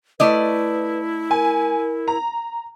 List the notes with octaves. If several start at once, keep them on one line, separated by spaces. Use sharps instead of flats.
A3 E4 B4 D5 D#5
A#4 G#5
A#5